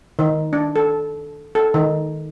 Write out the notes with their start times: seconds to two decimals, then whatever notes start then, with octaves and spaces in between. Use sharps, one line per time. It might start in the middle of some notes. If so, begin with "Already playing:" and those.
0.19 D#3
0.53 D4
0.76 A4
1.55 A4
1.74 D#3